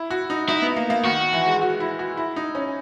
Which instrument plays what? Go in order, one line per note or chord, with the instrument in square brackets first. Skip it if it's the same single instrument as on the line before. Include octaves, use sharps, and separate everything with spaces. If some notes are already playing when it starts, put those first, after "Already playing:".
Already playing: [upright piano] E4
F#4
D#4
[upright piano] D#4 [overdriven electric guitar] E4
[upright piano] B3
A#3
A#3
[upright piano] D#3 [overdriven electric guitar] F#4
[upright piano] E3
G#3
F#4
E4
F#4
E4
D#4
C#4